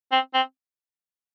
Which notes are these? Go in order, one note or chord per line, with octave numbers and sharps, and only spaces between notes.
C4
C4